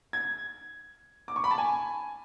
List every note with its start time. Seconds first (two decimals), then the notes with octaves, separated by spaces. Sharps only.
0.13 G#6
1.28 D6
1.36 C#6
1.44 B5
1.51 A5
1.58 G#5